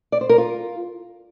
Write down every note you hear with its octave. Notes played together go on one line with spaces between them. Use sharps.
D5
C5
A#4
F4